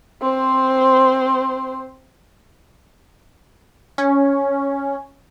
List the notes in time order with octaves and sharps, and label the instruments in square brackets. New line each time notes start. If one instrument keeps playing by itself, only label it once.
[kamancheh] C4 C5
[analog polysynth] C#4